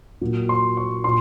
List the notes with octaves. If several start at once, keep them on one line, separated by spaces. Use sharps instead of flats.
A#2 F#3 A#3
C6
C#6
A#2 C6